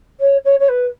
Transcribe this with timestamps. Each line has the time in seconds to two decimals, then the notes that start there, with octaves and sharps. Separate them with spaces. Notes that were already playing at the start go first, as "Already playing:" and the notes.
0.20 C#5
0.45 C#5
0.59 C#5
0.69 B4